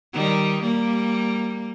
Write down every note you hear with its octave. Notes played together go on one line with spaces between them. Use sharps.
D#3 G3
G3 A#3